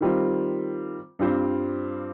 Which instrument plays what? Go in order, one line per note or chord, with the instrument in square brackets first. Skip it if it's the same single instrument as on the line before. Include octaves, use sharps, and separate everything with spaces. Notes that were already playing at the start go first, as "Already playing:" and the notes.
[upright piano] D#3 G3 C4 F4
G2 G3 C4 F4 C5